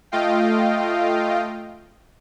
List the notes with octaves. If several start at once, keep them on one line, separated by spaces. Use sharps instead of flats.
A3 F4 D#5 F5 G5